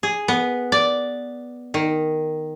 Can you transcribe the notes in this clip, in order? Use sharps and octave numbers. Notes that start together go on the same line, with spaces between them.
G#4
B3
D5
D#3